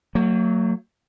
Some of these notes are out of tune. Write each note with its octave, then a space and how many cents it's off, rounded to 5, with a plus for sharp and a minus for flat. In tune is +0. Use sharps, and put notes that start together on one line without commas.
F#3 +0 A#3 -45